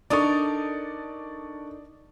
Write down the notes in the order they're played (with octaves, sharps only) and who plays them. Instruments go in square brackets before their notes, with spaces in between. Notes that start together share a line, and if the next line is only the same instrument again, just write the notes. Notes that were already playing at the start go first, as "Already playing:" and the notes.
[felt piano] D4 C#6 [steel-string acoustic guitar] D#4 A4 A#4 [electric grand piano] D5 D#6 A6